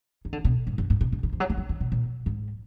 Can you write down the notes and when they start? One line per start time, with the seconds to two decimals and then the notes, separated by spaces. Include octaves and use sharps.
0.25 D#3
0.33 D3
0.44 B2
0.67 G#2
0.78 F#2
0.90 G#2
1.01 B2
1.12 B2
1.23 D#3
1.33 F3
1.40 F#3
1.50 G#3
1.57 F#3
1.69 D#3
1.80 B2
1.92 A#2
2.26 G#2